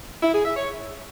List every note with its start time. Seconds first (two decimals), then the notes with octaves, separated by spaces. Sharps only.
0.23 E4
0.34 G#4
0.45 E5
0.57 C#5